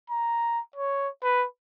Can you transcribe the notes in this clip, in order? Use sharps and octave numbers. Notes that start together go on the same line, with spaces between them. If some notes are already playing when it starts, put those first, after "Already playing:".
A#5
C#5
B4